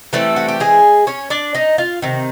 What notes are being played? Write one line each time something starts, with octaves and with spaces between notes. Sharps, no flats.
E3 G3 A3 C4 A4
F#4
G4
G#3 G#4
C#4 C#5
D4 D5
D#4 D#5
F4 F5
C3 D#3